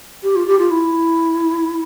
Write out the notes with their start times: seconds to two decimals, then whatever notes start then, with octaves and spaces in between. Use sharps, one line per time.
0.23 G4
0.36 F4
0.47 G4
0.59 F4
0.71 E4